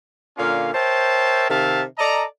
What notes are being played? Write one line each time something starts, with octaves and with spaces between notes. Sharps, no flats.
A#2 D3 A#3 C#4 F4 F5
A#4 C5 C#5 E5 G5 A5
C3 D#3 E5 F5 G5 A5
A4 D5 D#5 A5 A#5